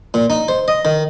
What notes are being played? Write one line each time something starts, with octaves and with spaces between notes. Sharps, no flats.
A#2
D#4
C5
D#5
D#3